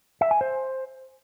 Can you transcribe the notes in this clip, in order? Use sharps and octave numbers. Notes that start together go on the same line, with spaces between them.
E5
G#5
C5